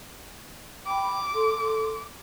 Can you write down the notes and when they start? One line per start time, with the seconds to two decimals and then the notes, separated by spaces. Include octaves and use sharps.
0.87 G5 B5 D6
1.34 A4 C6